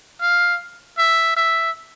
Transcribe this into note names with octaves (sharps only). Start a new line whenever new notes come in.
F5
E5
E5